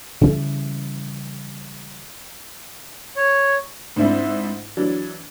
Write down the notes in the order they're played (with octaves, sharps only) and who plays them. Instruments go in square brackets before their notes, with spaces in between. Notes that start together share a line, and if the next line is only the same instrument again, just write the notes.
[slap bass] C#3 E3 F3 G3
[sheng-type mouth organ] C#5
[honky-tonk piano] G#2 C4 D4 E4
E3 F#3 D4